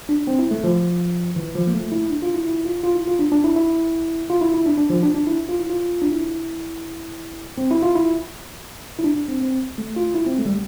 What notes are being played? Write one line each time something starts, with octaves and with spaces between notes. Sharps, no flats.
D4
C4
E4
A3
F3
E3
F3
A#3
A3
E4
D4
F4
E4
E4
F4
F4
E4
F4
D4
D4
E4
E4
F4
E4
E4
D4
D4
F3
D4
D4
E4
F4
E4
F4
D4
E4
C4
E4
F4
E4
E4
D4
D4
C4
C4
A3
F4
E4
C4
A3
G3